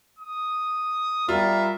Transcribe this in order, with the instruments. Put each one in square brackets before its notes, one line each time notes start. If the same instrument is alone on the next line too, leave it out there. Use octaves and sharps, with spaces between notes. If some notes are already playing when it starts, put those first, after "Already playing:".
[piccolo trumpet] D#6
[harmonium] G3 A#4 [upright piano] F4 [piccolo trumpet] E5